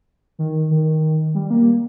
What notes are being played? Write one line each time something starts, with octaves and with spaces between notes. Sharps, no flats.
D#3
D#3
G3
A#3